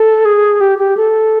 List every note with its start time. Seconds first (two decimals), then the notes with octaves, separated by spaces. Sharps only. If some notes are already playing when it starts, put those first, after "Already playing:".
Already playing: A4
0.25 G#4
0.61 G4
0.79 G4
0.97 A4